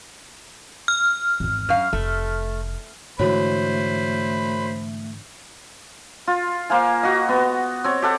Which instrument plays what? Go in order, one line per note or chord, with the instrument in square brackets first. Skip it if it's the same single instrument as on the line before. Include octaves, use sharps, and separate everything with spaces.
[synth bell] F6
[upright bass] G#1 E2
[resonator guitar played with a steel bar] F#2 F5
[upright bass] F1 [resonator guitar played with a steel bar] A3
[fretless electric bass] G#2 D3 E3 [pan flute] A3 [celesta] F#4 C#5 [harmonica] C5 B5
[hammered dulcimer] F4
A#3 C5 F5 G#5
F#4 D#5
B3
C4 C#5
G4 A4 F#5